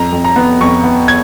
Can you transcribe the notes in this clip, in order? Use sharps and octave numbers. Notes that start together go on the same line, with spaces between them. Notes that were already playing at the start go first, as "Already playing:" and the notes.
Already playing: F2 A#5
F2
A#5
B3
F2 C#6
B3
G#6